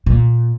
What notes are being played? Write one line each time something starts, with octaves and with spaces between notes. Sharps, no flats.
A#2